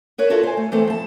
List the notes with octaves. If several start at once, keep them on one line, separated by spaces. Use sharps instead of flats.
A#4 B4 C#5
F4 F#4 A4 A#4 C#5 E5
C5 G#5
A3
E3 A3 C4 A4 C5
F2 A5